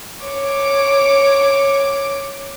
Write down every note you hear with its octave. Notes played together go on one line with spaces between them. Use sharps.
C#5 D6